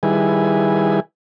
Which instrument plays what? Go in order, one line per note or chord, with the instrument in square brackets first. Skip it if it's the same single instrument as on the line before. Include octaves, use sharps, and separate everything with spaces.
[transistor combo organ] D#3 G3 E4 G#4 B4 G#5